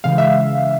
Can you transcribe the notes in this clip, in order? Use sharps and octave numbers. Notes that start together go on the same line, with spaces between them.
C#3 E3 G#3 F5
E5